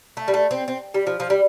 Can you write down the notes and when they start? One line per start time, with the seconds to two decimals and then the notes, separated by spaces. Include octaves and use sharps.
0.17 A3
0.28 G3
0.34 A3
0.51 C4
0.68 C4
0.94 G3
1.07 F3
1.20 F3
1.30 G3